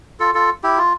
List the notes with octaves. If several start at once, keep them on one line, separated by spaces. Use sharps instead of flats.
F4 A4
F4 A4
E4 G4
F4